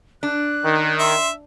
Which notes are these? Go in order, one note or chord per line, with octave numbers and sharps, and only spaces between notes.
D4 F#6
D#3
E5 C6